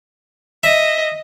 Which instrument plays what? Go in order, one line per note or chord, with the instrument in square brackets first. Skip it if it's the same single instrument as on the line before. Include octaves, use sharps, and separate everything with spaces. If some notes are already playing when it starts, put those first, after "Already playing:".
[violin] D#5 [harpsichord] E5